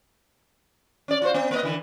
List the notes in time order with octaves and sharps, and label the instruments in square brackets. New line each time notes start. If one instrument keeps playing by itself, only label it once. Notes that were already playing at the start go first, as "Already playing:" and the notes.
[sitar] C#4 D5
F4 F#4 C5
B3
A#3 B4 D#5
D3 E3